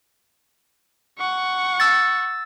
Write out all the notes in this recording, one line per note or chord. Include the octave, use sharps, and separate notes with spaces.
F#5 C#6
E6 A6